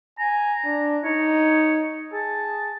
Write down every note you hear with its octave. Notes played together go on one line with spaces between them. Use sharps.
G#5 A#5
D4
D#4 C#5
G#4 A5